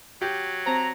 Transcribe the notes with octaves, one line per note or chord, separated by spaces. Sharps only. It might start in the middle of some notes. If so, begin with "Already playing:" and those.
F#3 G4
C4 C5 A#5